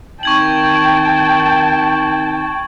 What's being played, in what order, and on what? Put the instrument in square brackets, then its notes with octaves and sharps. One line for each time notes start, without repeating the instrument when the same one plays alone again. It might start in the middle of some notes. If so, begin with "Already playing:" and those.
[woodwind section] D#3 C4 D#4 [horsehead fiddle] G5 A5 [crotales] C#6 G#6 F#7